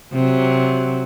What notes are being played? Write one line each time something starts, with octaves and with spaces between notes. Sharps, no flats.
C3 F#3